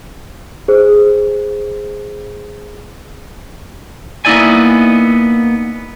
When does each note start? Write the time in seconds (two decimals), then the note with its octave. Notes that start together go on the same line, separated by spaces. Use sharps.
0.68 G#4 C5
4.25 A#3 B3 D#4 E4 D5 G#5